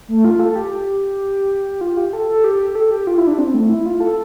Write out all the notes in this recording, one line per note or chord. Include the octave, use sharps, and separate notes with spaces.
A3
F4
A4
G4
F4
G4
A4
A4
G4
A4
G4
F4
E4
D4
C4
A3
E4
F4
A4